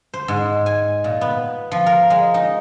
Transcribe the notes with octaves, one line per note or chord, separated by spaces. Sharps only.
C5
G#2
G#5
A#2
B3
F3
A#4
G#3
D#4